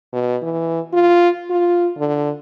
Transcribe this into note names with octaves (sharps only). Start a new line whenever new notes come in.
B2
E3
F4
F4
D3